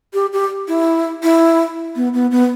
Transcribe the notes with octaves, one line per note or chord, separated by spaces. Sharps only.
G4
G4
E4
E4
B3
B3
B3